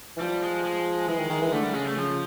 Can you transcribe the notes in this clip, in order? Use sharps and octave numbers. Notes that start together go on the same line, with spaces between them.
E3
F3 G3
G#3
G#3
E3 G#3
D#3
D#3
E3
D3 A3
G3
C#3 G#3
A3
C#3 F3